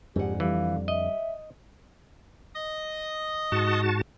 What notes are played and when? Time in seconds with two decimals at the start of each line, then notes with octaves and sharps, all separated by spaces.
0.16 F2 G#2 D3 G4 F#5
0.40 E3 G3 F5
0.88 D#5 E5
2.55 D#5 D#6
3.52 G#2 F#4 A5